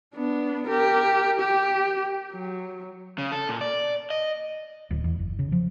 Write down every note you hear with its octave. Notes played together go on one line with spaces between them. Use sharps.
B3 D4
G4 A#4
G4
F#3
C#3
A4
A#2
D5
D#5
D1
E2
F#1
C#3
F3